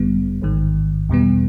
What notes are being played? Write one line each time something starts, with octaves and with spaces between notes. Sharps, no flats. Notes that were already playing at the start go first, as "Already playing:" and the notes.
Already playing: G1 F#2 D3 G3 B3
A1 G#2 D#3
E2 B2 G3 B3